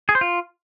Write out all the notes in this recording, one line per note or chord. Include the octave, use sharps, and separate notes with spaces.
G#4
C5
F4